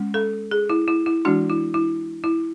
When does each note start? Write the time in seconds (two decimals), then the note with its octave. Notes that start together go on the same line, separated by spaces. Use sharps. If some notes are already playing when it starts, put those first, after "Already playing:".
Already playing: G#3 C#4
0.14 A4
0.51 G#4
0.70 E4
0.88 E4
1.06 E4
1.25 E3 G#3 D4 F#4
1.50 E4
1.74 E4
2.24 E4